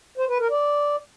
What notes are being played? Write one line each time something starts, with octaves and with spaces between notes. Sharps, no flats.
C5
B4
A#4
D5